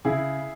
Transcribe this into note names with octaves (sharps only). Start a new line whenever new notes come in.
C#3 E4 G#4